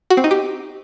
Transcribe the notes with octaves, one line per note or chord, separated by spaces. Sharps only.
F#4
C4
D#4
G4